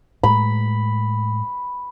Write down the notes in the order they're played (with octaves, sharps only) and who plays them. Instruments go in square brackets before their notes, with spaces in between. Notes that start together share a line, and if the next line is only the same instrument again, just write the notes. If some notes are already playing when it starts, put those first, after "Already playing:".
[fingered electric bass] A2 G#3 [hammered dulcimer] B5